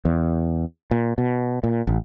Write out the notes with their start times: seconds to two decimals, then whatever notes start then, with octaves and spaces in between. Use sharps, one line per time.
0.05 E2
0.91 A#2
1.18 B2
1.63 A#2
1.87 A1